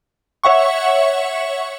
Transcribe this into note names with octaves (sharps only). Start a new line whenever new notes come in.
C#5 E5 F#5 C#6